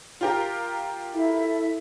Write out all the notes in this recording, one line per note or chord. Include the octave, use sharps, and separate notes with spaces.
F4 G4 A#4
E4 A4 E5